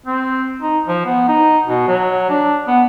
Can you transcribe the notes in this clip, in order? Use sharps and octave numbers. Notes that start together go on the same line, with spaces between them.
C4
D#4
F3
B3
D#4
B2
F#3
D4
B3